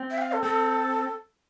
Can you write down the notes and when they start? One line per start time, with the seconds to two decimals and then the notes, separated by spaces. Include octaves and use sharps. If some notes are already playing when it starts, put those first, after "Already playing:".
Already playing: C4
0.11 E5
0.18 G5
0.22 F5
0.32 A4
0.43 C4 A4